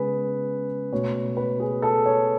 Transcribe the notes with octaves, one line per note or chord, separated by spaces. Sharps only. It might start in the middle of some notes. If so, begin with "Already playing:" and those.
Already playing: C#3 G#3 B3 G#4 B4
B2 A3 C#5
B4
G#4
A4
C#5